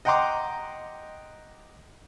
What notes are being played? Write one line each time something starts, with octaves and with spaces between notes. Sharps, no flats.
D#5 F#5 G5 A#5 C6 D6